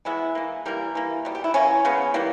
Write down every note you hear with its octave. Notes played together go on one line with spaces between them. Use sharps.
E3 G#3 B3 E4
E3 A#3
E3 G3 A#3 A#4
E3 A#3
B2 G3
G4
E4
E3 A#3 C#4
C#3 G#3 B3
E3 G3 A#3